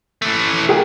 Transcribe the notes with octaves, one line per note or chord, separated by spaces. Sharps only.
E3 A3
G#4 A#4 G5